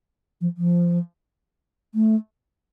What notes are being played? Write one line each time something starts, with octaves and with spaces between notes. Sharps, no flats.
F3
F3
A3